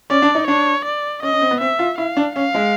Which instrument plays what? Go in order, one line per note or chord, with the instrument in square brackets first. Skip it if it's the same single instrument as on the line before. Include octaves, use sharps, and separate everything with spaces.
[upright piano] C#4 [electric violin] D5
[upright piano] D4
D#4
[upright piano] D4 [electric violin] C#5
[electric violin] D5
[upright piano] C#4 [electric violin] D#5
[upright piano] C#4
C4
B3
[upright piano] C4 [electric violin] E5
[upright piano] F4
[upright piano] E4 [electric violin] F5
[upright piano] D4
[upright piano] C#4 [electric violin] F5
[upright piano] G#3